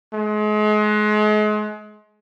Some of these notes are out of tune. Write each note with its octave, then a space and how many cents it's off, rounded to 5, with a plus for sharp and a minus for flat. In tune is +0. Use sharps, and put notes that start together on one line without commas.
G#3 +35